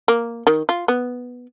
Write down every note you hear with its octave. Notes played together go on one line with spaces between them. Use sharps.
A#3
D#3
F4
B3